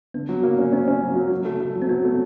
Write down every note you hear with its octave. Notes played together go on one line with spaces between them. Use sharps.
D3 B3
F#3
A#3
C#4
C4 C#4
C#4
F#3
F#3
F#3
A3
A3
F#3
C4
F#3 B3
A3